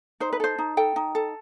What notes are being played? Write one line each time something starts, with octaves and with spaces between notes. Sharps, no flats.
D#4 C5
B4
A4 C5
D#4
A4 G5
D#4
A4